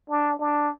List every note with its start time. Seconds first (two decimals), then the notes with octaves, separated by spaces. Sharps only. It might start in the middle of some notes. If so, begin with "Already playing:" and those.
0.10 D4
0.39 D4